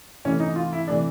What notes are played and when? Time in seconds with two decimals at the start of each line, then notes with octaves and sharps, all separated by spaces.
0.25 C3 E3 A3 C#4
0.40 D#4
0.56 F4
0.73 E4
0.87 C3 E3 A3 D4